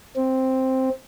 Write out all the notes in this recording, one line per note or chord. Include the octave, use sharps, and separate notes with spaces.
C4